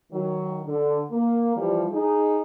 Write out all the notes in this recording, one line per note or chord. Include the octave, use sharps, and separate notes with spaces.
D#3 F#3
D3
A#3
E3 F3 G3
D#4 G#4